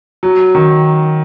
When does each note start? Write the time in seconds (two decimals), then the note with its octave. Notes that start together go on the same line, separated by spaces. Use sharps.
0.23 F#3
0.55 D#3